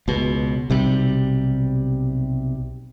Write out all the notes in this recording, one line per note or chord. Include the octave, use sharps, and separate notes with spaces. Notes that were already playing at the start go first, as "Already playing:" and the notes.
C#2 B2
B1 C3 G3